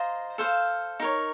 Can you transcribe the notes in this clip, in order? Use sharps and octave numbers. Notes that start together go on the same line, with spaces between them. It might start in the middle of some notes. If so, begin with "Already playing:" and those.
Already playing: F4 C5 D#5 A#5
A4 C5 F5
D#4 A#4 C#5